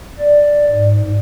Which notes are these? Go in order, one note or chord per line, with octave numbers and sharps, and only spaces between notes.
D5
G#2